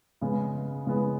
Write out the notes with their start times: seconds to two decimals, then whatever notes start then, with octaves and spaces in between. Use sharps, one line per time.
0.21 C#3 G#3 B3
0.86 C#3 G#3 B3